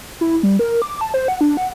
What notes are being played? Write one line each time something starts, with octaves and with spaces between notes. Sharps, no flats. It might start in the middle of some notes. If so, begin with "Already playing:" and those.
E4
G3
A#4
D6
A5
C5
F#5
D4
F#5